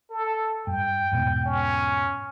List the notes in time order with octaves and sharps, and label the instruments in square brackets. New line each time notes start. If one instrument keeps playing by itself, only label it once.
[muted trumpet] A4
[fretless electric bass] G2 [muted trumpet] G5
[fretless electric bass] E2 G#2 B2
[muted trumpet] C#4